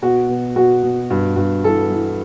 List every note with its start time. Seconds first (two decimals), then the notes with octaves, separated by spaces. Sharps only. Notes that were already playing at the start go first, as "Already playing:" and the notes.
0.02 B2 F#4
0.29 B2
0.56 B2 F#4
0.83 B2
1.10 G2
1.36 G2
1.64 E3 A4
1.90 E3